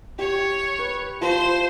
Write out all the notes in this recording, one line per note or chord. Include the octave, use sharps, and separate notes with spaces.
G4 C#5
B4
F3 C5 C6